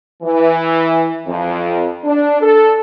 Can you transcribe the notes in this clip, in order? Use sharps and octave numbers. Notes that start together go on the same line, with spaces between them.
E3
F2
D4
A4